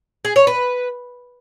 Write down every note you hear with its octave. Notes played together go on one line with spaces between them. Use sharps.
G#4
C#5
B4